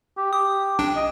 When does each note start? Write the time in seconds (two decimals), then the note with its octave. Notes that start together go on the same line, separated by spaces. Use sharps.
0.17 G4
0.33 G4 D#6
0.79 B1 D4 G5
0.96 D#5